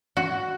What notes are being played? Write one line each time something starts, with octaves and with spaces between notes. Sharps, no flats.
F#4